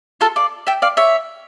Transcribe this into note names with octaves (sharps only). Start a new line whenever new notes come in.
F4 A4
D5 F5
E5 G5
D5 F5
C#5 E5